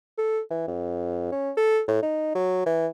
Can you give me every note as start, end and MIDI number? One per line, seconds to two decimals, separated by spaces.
0.18 0.40 69
0.50 0.66 52
0.67 1.30 41
1.32 1.51 61
1.57 1.80 69
1.88 2.02 45
2.03 2.32 63
2.35 2.63 54
2.66 2.87 52